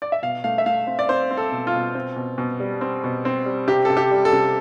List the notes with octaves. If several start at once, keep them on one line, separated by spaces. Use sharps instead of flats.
D5
E5
B2 F5
A3 F5
E5
A3 F5
C4
D5
C4 C5
C4
A4
B2
F4
B2
C4
B2
B2
G3
C4
B2
C4
G3
C3 G4
C3 A4
G4
G3
A4
C3